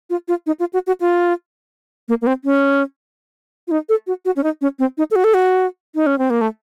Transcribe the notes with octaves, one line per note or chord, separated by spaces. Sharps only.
F4
F4
D#4
F4
F#4
F#4
F4
A#3
A#3
C4
C#4
F4
D#4
A4
F#4
F#4
C#4
D#4
C#4
C4
D#4
A4
F#4
A4
F#4
D#4
C#4
C4
A#3
A3